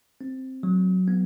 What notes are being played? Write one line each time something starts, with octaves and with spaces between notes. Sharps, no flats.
C4
F#3
B3